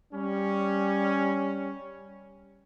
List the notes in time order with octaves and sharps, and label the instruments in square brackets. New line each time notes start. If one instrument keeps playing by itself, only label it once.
[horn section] G3 C#4